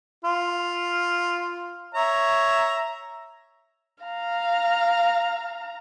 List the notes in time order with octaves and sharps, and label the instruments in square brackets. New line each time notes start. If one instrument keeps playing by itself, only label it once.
[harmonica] F4
C#5 E5 A#5
[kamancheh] F5 A#5